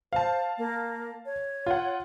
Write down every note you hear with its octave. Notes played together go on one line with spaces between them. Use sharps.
C5 F5 A5
A#3
C#5
F4 F#5